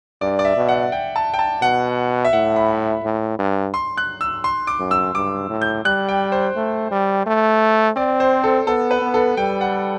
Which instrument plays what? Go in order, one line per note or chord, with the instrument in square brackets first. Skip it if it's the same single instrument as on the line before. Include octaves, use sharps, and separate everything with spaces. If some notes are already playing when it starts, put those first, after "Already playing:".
[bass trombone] G2 [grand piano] D5
[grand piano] D5
E5
[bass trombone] B2
[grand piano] F#5
G5
A5
G5
A5
[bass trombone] B2 [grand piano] F#5
[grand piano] E5
[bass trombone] A2 [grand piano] F#5
[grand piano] B5
[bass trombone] A2
G2
[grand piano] C6
F#6
E6
C6
D6
[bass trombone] F#2
[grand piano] E6
[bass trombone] G2 [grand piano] D6
[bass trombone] A2
[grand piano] G6
[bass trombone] G3 [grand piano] F#6
[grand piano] G5
C5
[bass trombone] A3
G3
A3
[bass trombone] C4 [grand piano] D5
[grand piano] C5
A4
[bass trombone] B3 [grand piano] A4
[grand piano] B4
[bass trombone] B3
[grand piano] A4
[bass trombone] G3 [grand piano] G5
[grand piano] F#5